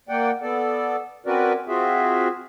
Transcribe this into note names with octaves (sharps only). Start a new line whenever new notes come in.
A#3 D5 F#5 G5
B3 A4 D5
C4 C#4 F#4 A#4 B4 D5
C4 F4 F#4 G#4 E5